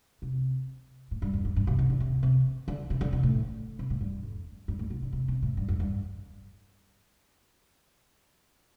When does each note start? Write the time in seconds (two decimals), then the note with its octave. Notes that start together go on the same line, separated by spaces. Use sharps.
0.22 C3
1.11 A2
1.22 G2
1.33 F2
1.45 G2
1.56 G2
1.67 C3
1.79 C3
1.90 D3
2.00 C3
2.23 C3
2.68 D3
2.90 C3
3.01 D3
3.13 C3
3.23 A2
3.79 C3
3.90 A2
4.01 G2
4.23 F2
4.68 G2
4.79 A2
4.90 C3
5.02 D3
5.13 C3
5.28 C3
5.42 A2
5.57 G2
5.68 F2
5.80 G2